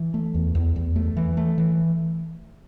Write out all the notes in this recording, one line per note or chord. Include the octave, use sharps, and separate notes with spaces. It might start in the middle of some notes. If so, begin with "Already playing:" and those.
Already playing: E3
A3
E2
E2
E2
A3
E3
A3
E3